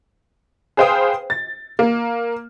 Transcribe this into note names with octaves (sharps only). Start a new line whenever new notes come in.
G#4 B4 C5 F5 G5 D#6
A6
A#3